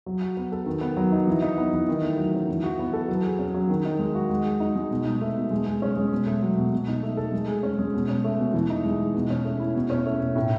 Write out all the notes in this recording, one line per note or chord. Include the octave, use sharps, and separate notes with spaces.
F#3
F#4
B3
A4
D#3
B3
F#3
D#4
E3
D#4
B3
E3
D#3
A3
F#3
C#4
E3
F#4
B3
A4
F#3
G#4
C#4
F#3
D#3
D#4
G#3
F#4
G#3
G#4
D#4
G#3
B2
D#4
A3
B2
G#3
G#4
C#4
G#3
B2
A3
F#3
B2
B2
D#4
A3
A4
G#3
G#4
C#4
G#3
B2
C#4
A3
B2
E3
D#4
G#3
G#4
B2
C#4
A3
E4
B2
C#4
A3
B2
A2